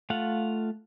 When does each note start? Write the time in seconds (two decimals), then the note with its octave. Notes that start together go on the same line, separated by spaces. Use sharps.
0.10 A3 F4 F5 F#5